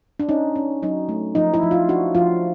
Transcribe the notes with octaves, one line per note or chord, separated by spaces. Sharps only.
D4
C#4 D#4
C#4
F#3 D#4
A3
F3 D#4
E4
F3
F4
D4 F#4
F3 F4